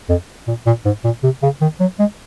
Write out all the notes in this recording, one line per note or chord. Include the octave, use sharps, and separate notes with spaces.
F2
A#2
A#2
G#2
A#2
C3
C#3
D#3
F#3
G#3